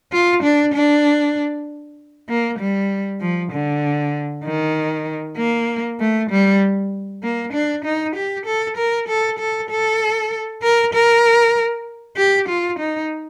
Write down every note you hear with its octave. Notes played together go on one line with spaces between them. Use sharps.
F4
D4
D4
A#3
G3
F3
D3
D#3
A#3
A3
G3
A#3
D4
D#4
G4
A4
A#4
A4
A4
A4
A#4
A#4
G4
F4
D#4